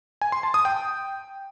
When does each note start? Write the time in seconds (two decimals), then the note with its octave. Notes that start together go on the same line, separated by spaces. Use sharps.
0.22 G#5
0.32 C6
0.43 A5
0.54 D#6
0.65 G5